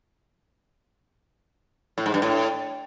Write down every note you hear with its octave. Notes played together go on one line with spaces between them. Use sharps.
A2
G#2
G2
A2